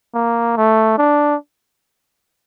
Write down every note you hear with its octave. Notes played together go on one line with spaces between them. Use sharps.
A#3
A3
D4